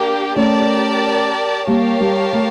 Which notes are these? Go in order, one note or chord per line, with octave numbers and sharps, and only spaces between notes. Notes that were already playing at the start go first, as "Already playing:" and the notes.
Already playing: A#3 D4 G4
A3 C#4 G4 A#4 D5 A5
G3 A#3 G4 A#4 C#5 F5 A5
G3
A3